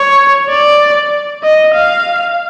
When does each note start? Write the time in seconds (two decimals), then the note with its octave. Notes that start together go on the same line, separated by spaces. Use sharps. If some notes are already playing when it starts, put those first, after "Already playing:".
Already playing: C#5
0.50 D5
1.43 D#5
1.74 F5